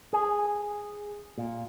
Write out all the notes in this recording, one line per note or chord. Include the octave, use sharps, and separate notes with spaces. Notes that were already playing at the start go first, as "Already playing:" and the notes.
G#4
A#2